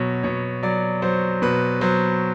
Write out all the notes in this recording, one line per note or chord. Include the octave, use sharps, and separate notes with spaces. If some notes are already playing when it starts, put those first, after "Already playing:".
Already playing: B2 F#3 C#5
B2 C#5
F#3 D5
F#3 C5
B2 B4
F#3 C5